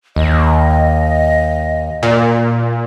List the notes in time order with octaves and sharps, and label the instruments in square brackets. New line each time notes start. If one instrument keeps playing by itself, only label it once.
[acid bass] D#2 [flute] D#5
[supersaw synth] A#2